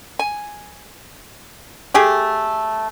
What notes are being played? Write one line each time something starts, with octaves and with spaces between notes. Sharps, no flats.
G#5
A3 G4 G#4